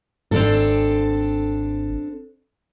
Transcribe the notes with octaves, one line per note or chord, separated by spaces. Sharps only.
G#1 C4 D4 A4